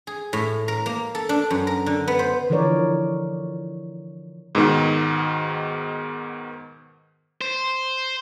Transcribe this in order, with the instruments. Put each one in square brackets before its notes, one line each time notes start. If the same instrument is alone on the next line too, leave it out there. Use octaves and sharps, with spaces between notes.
[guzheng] G#4
A2
A#4
A#3
A4
D4
F#2
A#4
D3
B3
C5
[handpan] D3 E3 F3 A#4 C#5 D5
[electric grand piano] G#2 B2 D#3
[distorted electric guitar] C5